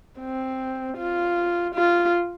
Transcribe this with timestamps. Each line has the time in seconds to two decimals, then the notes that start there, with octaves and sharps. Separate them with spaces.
0.20 C4
0.97 F4
1.75 F4